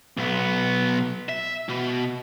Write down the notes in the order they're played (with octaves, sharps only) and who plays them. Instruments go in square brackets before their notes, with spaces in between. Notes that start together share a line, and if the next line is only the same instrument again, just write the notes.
[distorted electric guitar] B1 B3
E5
B2